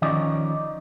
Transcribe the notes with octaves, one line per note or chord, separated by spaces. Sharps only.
D#3 F3 C#4 D#4 D5